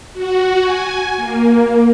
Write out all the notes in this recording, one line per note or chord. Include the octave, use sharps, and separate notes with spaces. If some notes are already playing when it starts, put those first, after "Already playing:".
F#4
G#5
A#3